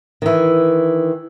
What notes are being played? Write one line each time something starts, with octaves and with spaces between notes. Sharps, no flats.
D#3 E3